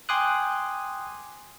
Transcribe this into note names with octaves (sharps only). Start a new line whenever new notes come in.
G5 G#5 C6 D6 D#6 F#6